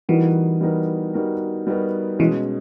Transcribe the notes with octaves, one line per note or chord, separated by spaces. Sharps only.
E3 G3 B3 D#4 F#4 A#4
G3 B3 D#4 F#4 A#4
G3 B3 D#4 F#4 A#4
G3 B3 D#4 F#4 A#4
B2 E3 G#3 C#4